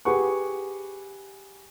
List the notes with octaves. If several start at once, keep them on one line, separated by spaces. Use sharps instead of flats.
G4 G#4 B4 F#5 C#6